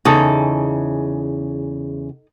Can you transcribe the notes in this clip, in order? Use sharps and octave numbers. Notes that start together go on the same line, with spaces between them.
E2 C#3 D#4 A4